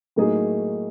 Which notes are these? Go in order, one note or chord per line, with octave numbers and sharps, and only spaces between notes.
A2 F#3 A#3 D#4 G#4